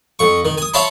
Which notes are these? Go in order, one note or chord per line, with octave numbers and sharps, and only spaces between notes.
F2 C#6
D#3
G#5 D#6
C#5 E5 F5 A5 B5 C6